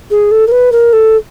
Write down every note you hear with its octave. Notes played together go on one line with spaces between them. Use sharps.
G#4
A4
A#4
B4
A#4
A4